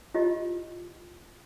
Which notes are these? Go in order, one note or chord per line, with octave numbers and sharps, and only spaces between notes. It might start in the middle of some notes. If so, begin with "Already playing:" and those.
E4 F4 G4 D#5